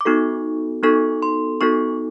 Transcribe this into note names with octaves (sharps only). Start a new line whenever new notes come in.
D6
B3 D#4 F#4 A4 C#6
B3 D#4 F#4 A4 C#6
C6
B3 D#4 F#4 A4 C#6